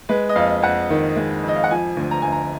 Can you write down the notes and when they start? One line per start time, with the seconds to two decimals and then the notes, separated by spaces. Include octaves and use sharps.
0.09 G#3 B4
0.29 D#5
0.36 F2 F5
0.62 F2 F#5
0.90 D#3
1.17 G#3
1.43 F2 D#5
1.56 F5
1.64 F#5
1.71 F3 G#5
1.97 D2
2.11 A#5
2.22 D2 G#5
2.32 A#5